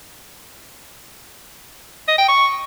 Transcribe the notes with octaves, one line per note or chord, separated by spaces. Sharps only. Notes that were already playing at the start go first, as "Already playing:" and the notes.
D#5
G5
C#6